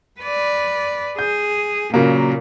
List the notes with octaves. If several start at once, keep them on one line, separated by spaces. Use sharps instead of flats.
B4 D5
G#4 G6
A#2 C#3 F#3 A#3